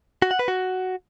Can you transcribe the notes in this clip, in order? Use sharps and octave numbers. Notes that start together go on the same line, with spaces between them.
F#4
F#5
B4
F#4